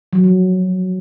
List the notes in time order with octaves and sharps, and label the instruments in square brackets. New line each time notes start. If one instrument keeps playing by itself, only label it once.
[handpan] F#3
F3